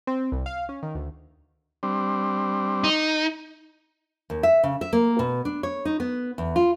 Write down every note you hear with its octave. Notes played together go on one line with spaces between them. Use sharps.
C4
C2
F5
C#4
D#3
D2
G3 C4 D4
D#4
D#2
E5
C#3
E5
A#3
B2
D4
C#5
D#4
B3
E2
F4